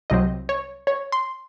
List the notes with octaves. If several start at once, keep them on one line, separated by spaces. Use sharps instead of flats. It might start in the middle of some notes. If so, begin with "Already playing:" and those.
C2 C3 F#3 C4 D#5
C#5
C#5
C6